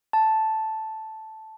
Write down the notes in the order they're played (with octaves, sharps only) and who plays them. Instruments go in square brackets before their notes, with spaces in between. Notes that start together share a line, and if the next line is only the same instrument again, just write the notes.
[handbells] A5